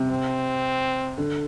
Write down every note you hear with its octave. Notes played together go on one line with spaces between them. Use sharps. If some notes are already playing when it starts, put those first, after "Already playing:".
Already playing: C3
C4
D3